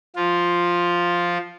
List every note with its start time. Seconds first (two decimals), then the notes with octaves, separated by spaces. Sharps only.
0.16 F3 F4